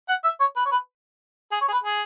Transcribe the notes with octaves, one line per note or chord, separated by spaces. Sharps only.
F#5
E5
C#5
B4
C#5
B4
G#4
C#5
G#4
B4
G#4